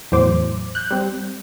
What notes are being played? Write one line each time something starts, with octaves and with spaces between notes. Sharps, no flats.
E2 A2 F#3 C5 D6
F#6 G6
G3 C4